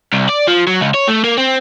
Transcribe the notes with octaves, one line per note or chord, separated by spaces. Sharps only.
C2
D5
F3
F#3
C#2
C#5
A3
A#3
C4